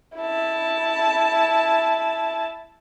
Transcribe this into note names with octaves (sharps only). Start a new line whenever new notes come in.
E4 A5